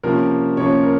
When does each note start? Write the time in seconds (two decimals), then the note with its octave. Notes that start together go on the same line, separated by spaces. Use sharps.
0.03 C3 F3 A#3 C#4 A#4
0.57 C3 F3 A#3 C#4 C#5
0.83 A#4